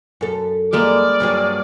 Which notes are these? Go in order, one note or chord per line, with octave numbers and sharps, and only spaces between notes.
F#2 A4
G3 G#3 A#3 D5 F6
G2 F#3 G3 D4 G#4